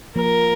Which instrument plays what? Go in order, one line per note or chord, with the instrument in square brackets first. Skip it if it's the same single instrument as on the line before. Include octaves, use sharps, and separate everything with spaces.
[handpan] F3 A#3 [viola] A#4